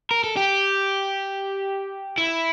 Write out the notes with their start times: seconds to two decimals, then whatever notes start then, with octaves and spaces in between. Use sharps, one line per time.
0.11 A#4
0.24 A4
0.37 G4
2.18 E4